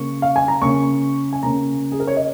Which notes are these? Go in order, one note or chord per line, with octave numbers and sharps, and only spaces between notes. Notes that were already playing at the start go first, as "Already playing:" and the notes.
Already playing: C#3 A#3 C#4 C#6
F5
G#5
A#5
C#3 A#3 C#4 C#6
G#5
C#3 A#3 C#4 A#5
G#4
A#4
C#5
D#5